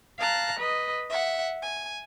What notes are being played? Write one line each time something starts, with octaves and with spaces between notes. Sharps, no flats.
F5 A5 A#5 F#6
B4 D#5
E5 F#5
G#5